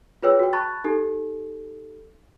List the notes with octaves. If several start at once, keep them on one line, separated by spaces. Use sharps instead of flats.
F4 G#4 B4 C#5 G5 E6
F#4 G5
A5 B5 C#6 F#6 A6
D#4 G4 A4